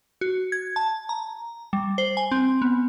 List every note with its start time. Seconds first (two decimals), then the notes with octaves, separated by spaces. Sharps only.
0.21 F#4
0.52 G#6
0.76 A5
1.09 A#5
1.73 G3
1.98 C5
2.17 G#5
2.31 C4
2.62 B3